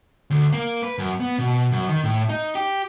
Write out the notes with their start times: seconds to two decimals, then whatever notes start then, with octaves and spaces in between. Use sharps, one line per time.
0.30 D2
0.53 A#3
0.83 B4
0.98 F#2
1.20 B3
1.39 B2
1.72 F#2
1.89 D#3
2.04 A2
2.29 D#4
2.55 G4